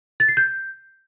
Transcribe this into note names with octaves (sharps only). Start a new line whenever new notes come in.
A6
C7
G6